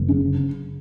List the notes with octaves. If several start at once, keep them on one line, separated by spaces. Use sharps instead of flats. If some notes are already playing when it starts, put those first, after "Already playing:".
Already playing: F#1
C#3